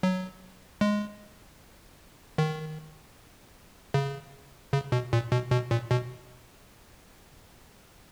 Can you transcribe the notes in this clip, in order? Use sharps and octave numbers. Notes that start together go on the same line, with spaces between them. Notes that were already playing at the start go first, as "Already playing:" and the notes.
F#3
G#3
D#3
C#3
C#3
B2
A#2
B2
B2
A#2
B2